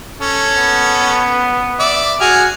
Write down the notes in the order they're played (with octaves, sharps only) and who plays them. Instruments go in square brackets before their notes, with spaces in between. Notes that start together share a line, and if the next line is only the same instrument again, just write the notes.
[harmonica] C#4 A4
[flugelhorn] B3
[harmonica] D5 E5
[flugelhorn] F#4 [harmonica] G#4 G#5 F6